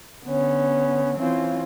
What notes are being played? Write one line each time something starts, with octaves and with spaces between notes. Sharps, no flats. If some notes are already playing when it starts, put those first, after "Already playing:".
D3 B3 C#4
E3 C4 C#4 F4